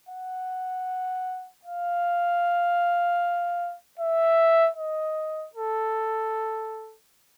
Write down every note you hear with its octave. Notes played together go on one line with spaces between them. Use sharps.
F#5
F5
E5
D#5
A4